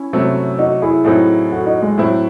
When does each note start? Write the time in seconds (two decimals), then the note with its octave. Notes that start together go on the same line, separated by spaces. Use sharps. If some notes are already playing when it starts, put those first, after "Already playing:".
Already playing: C#4 E4
0.13 C3 F#3 A3 C4
0.59 D#4 F#4
0.82 E4 G#4
1.04 A2 F#3 C4 D#4 E4 G#4
1.51 F#4 A4
1.66 D#4 F#4
1.82 G#3
1.97 A2 F#3 A3 C4 E4